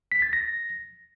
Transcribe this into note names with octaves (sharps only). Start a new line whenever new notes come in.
B6
A6
A#6